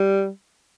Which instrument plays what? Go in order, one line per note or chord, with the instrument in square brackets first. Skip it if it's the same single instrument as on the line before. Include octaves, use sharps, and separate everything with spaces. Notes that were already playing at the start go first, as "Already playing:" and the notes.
Already playing: [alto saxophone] G3